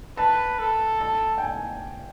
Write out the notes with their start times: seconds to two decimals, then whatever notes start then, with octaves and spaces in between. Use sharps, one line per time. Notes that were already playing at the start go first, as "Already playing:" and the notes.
0.17 B4 A5
0.59 A4
1.01 A5
1.38 G5
1.42 G#5